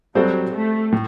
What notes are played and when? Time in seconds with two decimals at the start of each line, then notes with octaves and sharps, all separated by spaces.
0.15 F#3 G3 C4 F#4 A4 C5
0.53 A3
0.92 A2